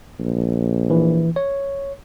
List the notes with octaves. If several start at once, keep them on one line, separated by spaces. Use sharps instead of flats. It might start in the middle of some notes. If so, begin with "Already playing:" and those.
A#1
E3
C#5